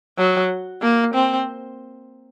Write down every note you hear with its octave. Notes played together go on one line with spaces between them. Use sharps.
F#3
A#3
C4